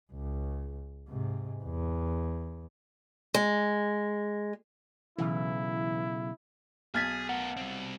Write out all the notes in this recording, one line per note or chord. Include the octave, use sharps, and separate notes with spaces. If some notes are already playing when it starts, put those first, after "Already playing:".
C#2
G#2 C3
E2
G#3
B1 C#3 E3 E4
B1 G#4 F6 G#6 A6 B6
B3 A#4 F#5
G3 C4